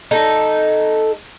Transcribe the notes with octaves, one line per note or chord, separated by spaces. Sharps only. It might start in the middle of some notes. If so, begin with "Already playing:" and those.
D#4 A4